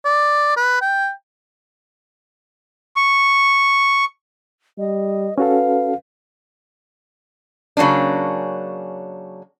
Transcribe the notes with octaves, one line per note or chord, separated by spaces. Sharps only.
D5
B4
G5
C#6
G3 D#5
C#4 F#4 A4 B4 F5
C#3 F#3 A#3 C#4 D4